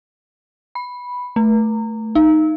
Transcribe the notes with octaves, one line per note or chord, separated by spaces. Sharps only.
B5
A3
D#4